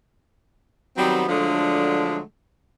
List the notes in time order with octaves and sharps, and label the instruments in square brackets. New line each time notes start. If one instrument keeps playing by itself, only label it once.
[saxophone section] D#3 F#3 G3 B3 C4
D3 F3 F#3 G#3 A3 D4